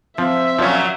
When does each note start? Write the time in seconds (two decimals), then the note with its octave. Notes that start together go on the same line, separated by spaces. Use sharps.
0.18 F3 C4 E5
0.59 A#2 F3 F#3 A#3 C#4